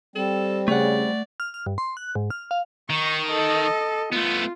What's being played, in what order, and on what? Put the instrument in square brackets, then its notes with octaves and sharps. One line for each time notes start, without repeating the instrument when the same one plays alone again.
[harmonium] G3 C4 [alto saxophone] A4
[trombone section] C#3 [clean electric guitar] A3 F#5 [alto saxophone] D5
[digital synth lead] F6
F6
G2
C6
F#6
G#2
F6
F5
[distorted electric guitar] D#3 [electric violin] C#6
[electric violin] A4 D#5
[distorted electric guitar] A3 B3 [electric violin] F4